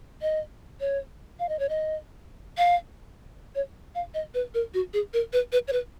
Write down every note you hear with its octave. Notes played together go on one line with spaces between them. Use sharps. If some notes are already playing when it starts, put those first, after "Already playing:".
D#5
C#5
F5
D#5
C#5
D#5
F5
C#5
F5
D#5
B4
A#4
F#4
G#4
A#4
B4
B4
C#5
B4